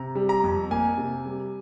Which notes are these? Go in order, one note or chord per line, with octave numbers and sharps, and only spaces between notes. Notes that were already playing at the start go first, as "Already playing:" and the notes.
Already playing: C3 A#5
G3
A#5
F2
A#3 G#5
C3
G3